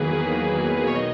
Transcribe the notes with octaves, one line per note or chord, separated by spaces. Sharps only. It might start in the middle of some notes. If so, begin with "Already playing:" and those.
Already playing: E2 D#3 F#3 A#3 G#4 B4
D#3
D#3
E2
D#3
B2 C#5
D#5